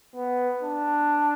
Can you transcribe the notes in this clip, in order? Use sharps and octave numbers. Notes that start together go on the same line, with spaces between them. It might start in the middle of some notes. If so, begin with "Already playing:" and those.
B3
D4